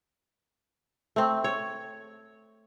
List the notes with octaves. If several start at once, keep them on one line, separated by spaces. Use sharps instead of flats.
A3 C4
C#5